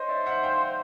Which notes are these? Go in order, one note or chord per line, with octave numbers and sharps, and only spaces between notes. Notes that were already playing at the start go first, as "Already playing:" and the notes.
Already playing: C5 C#5 D#5
D5 E5
E5 F#5
F5 G5